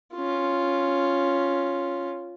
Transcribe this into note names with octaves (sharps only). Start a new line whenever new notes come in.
C#4 F4